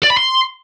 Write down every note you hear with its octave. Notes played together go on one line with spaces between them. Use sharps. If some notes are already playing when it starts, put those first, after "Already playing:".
D5
B5
C6